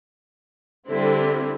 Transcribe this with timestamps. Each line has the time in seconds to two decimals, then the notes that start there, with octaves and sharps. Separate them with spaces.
0.89 D3 G3 C4 E4